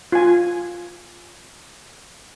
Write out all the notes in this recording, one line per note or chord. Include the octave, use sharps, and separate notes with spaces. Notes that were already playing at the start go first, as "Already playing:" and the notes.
F4 G#5